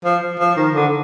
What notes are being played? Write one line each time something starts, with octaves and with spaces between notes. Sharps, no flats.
F3
F3
D#3
D3